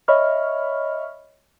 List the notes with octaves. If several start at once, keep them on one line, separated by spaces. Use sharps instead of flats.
C#5 D#5 E5 B5 C#6 F6